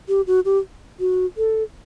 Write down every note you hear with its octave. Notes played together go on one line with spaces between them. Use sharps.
G4
F#4
G4
F#4
A4